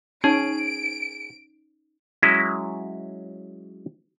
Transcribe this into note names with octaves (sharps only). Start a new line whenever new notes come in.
C#4 D#4 G#4 D7
F#3 G#3 C#4 E4